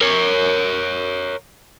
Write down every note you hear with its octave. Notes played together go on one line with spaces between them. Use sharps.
A#4 C#5